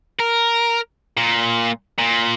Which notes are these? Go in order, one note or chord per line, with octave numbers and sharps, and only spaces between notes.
A#4
A#2
A#2